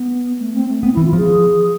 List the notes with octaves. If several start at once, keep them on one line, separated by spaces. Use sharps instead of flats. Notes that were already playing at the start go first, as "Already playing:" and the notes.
Already playing: B3
A3
C4
A3
B3 C4
E3 E4
F4
F3 G#4